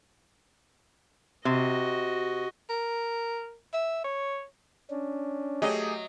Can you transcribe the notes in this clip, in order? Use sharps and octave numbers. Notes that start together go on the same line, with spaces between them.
C3 F#4 D#5
A#4
E5
C#5
C#4 D4
F#3 A3 G4 G#4 D#5